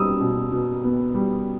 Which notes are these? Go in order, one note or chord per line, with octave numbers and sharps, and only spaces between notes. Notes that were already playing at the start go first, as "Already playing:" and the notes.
Already playing: B2 G3 B3 D#6 E6
B2
B2
B3
G3